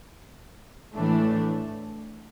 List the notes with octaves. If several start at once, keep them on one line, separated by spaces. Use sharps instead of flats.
A2 E3 A3 D4